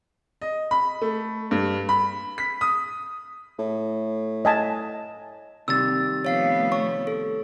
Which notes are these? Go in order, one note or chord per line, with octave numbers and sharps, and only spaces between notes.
D#5
B5
A3
G2
B5
B6
D#6
A2
D#5 G#5 A5
C3 D#3 G3 E6 A6
F3 A3 B3 C#5 F5 C7
C#5 C#6
A4